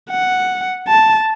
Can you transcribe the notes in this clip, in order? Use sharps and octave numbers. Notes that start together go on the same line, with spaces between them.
F#5
A5